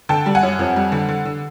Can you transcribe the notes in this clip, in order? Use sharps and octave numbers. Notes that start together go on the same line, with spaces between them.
D3 G5 A5
G3
F#5 G#5
F#2
F2
G3
D3
D3
D3